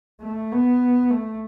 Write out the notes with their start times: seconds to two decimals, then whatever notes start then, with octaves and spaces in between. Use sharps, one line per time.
0.21 A3
0.52 B3
1.11 A3